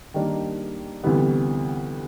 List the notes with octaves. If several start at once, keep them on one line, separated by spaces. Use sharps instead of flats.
D#3 G3 A#3 D4
D2 C3 E3 G3 B3